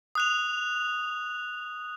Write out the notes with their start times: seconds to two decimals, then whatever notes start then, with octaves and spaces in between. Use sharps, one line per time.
0.15 D#6 F#6 F7